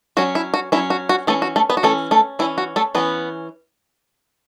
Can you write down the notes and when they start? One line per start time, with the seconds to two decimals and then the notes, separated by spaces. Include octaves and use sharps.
0.17 F#3 C#4 F#4
0.35 E4
0.54 F#4
0.72 F#3 C#4 E4
0.90 F#4
1.09 F#4
1.27 E3 A3 C#4 A4
1.42 F#4
1.56 A3 A4
1.70 B3 B4
1.77 F#4
1.83 E3 A3 C#4 A4
2.11 A3 A4
2.39 E3 C#4 E4
2.58 F#4
2.76 A3 A4
2.95 E3 B3 C#4 B4